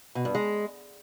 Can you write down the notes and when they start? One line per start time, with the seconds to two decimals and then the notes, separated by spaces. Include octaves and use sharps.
0.15 B2
0.25 G2
0.35 G#3